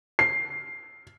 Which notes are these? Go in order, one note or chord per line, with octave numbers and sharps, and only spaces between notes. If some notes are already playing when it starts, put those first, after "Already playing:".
C7